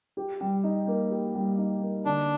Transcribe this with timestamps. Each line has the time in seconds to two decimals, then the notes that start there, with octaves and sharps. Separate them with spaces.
0.17 G4
0.41 G3
0.64 D#4
0.87 A#3
1.10 G4
1.35 G3
1.58 D#4
1.82 A#3
2.05 D3 D4